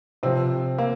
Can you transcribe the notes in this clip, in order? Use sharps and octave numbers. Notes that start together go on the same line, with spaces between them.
C3 F3 C4
A#3